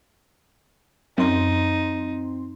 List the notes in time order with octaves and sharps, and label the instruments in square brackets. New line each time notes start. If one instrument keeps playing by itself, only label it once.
[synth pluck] F#2 [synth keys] C4 C6 [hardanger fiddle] D#4